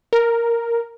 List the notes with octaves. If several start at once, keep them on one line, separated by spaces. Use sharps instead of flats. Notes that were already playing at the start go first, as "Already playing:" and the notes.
A#4